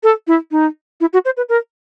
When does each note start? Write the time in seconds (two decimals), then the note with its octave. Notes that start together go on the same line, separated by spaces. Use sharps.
0.03 A4
0.27 E4
0.51 D#4
1.00 E4
1.13 F#4
1.25 C5
1.37 B4
1.49 A#4